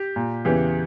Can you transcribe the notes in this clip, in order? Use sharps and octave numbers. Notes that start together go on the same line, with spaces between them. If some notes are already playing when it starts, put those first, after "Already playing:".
Already playing: G4
A#2
E2 C#3 E3 G4